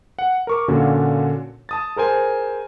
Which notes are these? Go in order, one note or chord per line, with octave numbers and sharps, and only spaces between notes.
F#5
A#4 C#6 D6
A#2 D3 C#4 D4 F4 F#4
A5 D#6 A6
G#4 A#4 C5 G#5